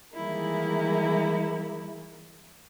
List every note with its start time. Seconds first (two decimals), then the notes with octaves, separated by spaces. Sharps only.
0.16 D#3 E3 G3 G#3 A#3 E4